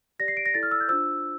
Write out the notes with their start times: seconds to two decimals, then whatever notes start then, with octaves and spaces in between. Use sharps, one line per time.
0.19 G4 D5 A#6
0.28 C7
0.37 D7
0.46 A#6
0.54 E4 A4 D5 A6
0.63 F6
0.71 E6
0.80 G6
0.88 D4 F4 C5 E6